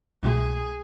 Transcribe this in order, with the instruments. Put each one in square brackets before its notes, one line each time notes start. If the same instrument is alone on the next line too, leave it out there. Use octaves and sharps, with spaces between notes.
[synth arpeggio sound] C2 B2 A3 [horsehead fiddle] G#4